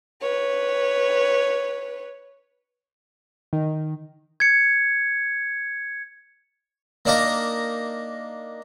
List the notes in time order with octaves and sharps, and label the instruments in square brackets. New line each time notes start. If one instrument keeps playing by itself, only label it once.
[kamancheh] B4 C#5
[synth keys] D#3
[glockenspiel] G#6 C#7
[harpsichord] A#3 D4 D#4 F5 A#5